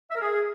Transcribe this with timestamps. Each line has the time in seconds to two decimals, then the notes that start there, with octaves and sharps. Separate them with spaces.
0.10 E5
0.15 A#4
0.21 G#4